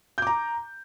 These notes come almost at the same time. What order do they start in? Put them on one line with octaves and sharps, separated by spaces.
G6 D6 A#5